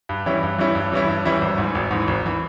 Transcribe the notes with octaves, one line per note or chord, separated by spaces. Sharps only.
G2
E3 G3 C#4 E4
G2
E3 G3 C#4 E4
G2
E3 G3 C#4 E4
G2
E3 G3 C#4 E4
G#1
G#2
E3
G#1
G#2 E3
G#1
E3